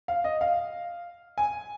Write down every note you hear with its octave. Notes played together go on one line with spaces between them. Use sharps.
F5
D#5
F5
G#5